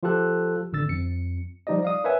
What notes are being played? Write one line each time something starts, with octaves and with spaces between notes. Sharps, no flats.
F3 F4 G4 A4 F#6
G#1 D3 E6 A6
F2 C#7
F3 G3 D#4 G4 D5 D#5
D5 F5 D#6
A#4 B4 C#5 E5 F#5 G#5